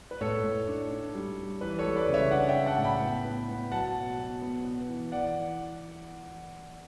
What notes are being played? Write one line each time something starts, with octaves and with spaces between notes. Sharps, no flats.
B4
A2 A4 C#5
A2
D4
D4
G3
G3
E3 B4
A4 C#5
G3
B4 D5
C#3
C#5 E5
D4 D5 F#5
E5 G5
D4
F#5 A5
A2
G5 B5
B3
B3
B3
F#3 F#5 A5
B2
B2
B3
B3
E3
E3 D5 F#5
E3